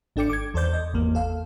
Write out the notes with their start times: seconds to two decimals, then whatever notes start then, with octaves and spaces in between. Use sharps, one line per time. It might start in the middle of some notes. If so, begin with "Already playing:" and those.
0.16 G#1 D4 A4 G5 D6 C#7
0.30 D6 G#6
0.54 E2 A4 C5 D5 G6
0.73 D#5
0.93 G#1 E2 A#3
1.15 A4 F5